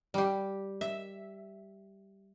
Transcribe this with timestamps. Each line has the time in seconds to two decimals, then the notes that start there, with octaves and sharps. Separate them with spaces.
0.14 G3 G4
0.81 E5